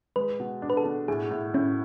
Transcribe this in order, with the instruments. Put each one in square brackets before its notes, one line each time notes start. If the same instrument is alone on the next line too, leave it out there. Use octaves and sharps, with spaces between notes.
[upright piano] G#3 [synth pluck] B4
[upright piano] B2
D4
[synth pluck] B4
A4
[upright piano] B2
[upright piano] A2 [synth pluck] G#4
[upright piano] A2
[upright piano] A2 [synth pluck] C#4